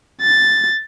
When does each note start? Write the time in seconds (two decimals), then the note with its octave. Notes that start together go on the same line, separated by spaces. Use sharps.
0.22 A6